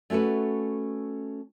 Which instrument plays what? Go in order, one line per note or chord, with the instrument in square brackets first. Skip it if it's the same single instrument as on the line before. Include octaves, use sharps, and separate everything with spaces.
[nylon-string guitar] A3 C#4 F#4 A4 B4